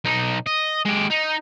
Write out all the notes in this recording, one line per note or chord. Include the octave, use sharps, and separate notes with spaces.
B1 D#4
D#5
G#3 G4
D#4